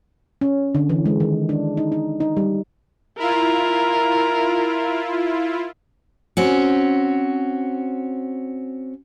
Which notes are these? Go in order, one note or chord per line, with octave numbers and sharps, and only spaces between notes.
C#4
D3
E3
G#3
D#3
D4
D#4
D#4
D#4
G3
E4 F4 A#4
C4 C#4 F#4